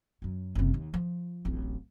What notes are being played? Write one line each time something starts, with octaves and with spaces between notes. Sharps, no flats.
F#2 F#3
F#1 C3
D#2
F3
D1 A1